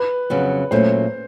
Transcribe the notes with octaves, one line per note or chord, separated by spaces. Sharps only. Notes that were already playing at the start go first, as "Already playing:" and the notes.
Already playing: B4
F2 C#3 F#3 B3
A#2 F#3 A3 C#4 C5